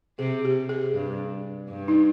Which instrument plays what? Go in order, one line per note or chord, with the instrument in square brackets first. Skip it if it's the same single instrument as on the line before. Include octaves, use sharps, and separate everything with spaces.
[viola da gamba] C3 [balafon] G#4
[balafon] G4
G#4
[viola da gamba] G2
G2
[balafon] D#4